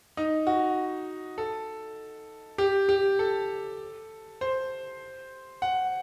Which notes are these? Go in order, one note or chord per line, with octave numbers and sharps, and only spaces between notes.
D#4
F#4
A4
G4
G4
A4
C5
F#5